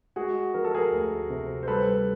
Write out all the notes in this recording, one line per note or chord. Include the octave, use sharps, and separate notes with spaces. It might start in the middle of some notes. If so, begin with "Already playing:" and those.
G#3 F#4 G#4
F3 A#4
A4
G#4 A#4
D2
C3
C5
G3 A4 B4